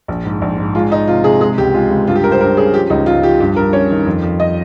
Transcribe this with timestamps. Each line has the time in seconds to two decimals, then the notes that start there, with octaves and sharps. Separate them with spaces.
0.08 A#1
0.25 G#2
0.42 A#1
0.58 G#2
0.75 G#3 F4
0.92 F3 D#4
1.08 C3 F4
1.24 C3 G#4
1.40 G#3 G#4
1.58 C#2 G4
1.74 G#3 F4
1.90 C#2
2.07 G2 F4
2.15 G4
2.24 G2 A#4
2.32 C5
2.41 G2 A#4
2.57 C#4 G#4
2.74 F3 G4
2.90 C#2 D#4
3.06 C#2 F4
3.23 F3 G4
3.40 G2 G4
3.56 G2 A#4
3.73 C#4 C#5
3.90 D#3
4.06 F2
4.23 F2
4.40 D#5